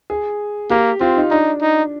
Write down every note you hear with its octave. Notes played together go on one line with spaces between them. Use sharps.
G#4
A#3 G4
C4 F4
D#4
D4 D#4
D#4